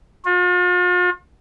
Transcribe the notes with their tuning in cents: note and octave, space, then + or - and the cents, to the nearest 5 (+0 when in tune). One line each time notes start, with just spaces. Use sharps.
F4 +45